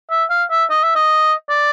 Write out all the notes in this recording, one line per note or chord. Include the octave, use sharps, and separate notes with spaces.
E5
F5
E5
D#5
E5
D#5
D5